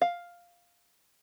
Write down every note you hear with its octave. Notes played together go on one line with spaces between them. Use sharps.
F5